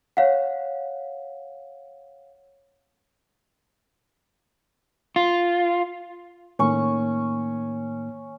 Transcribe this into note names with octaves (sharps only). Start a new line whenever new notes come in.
C#5 F5 F#5
F4
A2 D#3 A#3 C#4 C#6